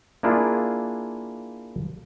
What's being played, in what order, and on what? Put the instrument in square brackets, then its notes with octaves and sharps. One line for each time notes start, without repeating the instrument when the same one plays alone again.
[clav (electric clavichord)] A#3 D4 E4 F4 G#4